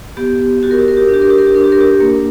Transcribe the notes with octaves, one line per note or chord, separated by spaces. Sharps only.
B3 G4
F#4 G4
A#4
G4
A#4
G4
A#4
D4
G4
A#4
G4
A#4
G4
D4 A#4
G4
A#4
G4
A#3 A#4